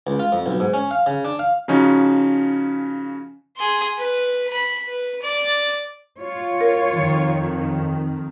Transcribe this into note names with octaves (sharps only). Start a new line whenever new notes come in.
C#2
F4
F2
B1
G#2
C#4
F5
C#3
D4
F5
C#3 F3 C#4 D#4 F#4
G#4 C6
B4
B5
B4
D5
F4 C#5
A#4
F2 D#3